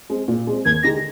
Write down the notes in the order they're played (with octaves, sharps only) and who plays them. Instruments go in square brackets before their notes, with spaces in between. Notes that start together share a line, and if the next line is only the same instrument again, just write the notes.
[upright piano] G#3 C4
A#2
G#3 C4
[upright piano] D#2 [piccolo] G#6
[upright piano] D3 G#3 D#4 G4 [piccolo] A#6